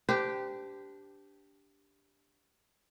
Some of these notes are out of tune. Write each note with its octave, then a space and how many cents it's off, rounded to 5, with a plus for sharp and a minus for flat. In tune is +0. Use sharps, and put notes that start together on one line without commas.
D4 -10 G4 +0 C5 -35